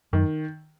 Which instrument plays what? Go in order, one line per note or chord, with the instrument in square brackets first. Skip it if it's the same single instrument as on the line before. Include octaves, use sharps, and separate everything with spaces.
[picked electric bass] F#2 [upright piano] D#3